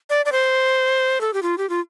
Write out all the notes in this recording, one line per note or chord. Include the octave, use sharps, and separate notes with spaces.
D5
D5
C5
A4
G4
F4
G4
F4